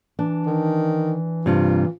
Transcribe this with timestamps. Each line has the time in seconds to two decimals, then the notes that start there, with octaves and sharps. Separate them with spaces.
0.19 E3 D4
0.46 D#3
1.46 G2 C3 F4